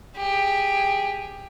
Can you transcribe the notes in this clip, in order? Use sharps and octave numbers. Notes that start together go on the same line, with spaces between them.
G4 G#4